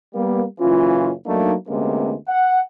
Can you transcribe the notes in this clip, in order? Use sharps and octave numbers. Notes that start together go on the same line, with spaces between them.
G3 A#3 B3
F#1 E3 C#4 F4
F#3 A3 A#3 D4 D#4
D2 C3 G#3 A#3 B3 C#4
F#5